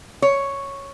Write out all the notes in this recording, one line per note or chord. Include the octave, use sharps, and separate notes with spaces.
C#5